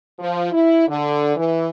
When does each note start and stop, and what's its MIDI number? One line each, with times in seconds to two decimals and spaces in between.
0.19 0.49 53
0.52 0.86 64
0.87 1.36 50
1.37 1.68 52